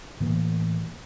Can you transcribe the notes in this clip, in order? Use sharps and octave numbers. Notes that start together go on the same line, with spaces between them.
A2 E3 A#3